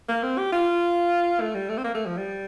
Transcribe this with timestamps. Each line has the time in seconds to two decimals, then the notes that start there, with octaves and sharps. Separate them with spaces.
0.09 A#3
0.23 C4
0.38 G4
0.52 F4
1.41 A3
1.55 G3
1.69 A3
1.77 C4
1.84 A#3
1.95 A3
2.06 F3
2.17 G3